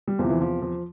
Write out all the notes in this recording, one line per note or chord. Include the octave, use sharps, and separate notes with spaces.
G3
E2 C3 E3 F3
E3
F3
F3